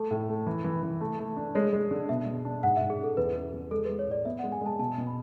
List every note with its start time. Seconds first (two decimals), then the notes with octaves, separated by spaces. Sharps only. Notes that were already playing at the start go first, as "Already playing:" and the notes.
Already playing: A3 A4
0.11 A2
0.29 A3
0.46 E3
0.64 E3
0.83 E3
1.01 A3
1.19 A3
1.37 D4
1.55 G#3 C#5
1.73 G#3
1.91 D3
2.09 B2 E5
2.27 B2
2.45 D4
2.63 G#2 F#5
2.77 E5
2.81 G#2
2.90 G#4
2.99 C#4 A4
3.17 E2 B4
3.35 C#3
3.53 E2
3.71 G#3 A4
3.85 B4
3.89 G#3
3.99 C#5
4.07 A2 D5
4.25 B3 E5
4.39 F#5
4.44 G#3
4.52 G#5
4.61 G#3 A5
4.79 B2 A5
4.98 B2
5.07 B5